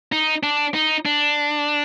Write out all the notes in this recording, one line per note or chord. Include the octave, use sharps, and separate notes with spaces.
D#4
D4
D#4
D4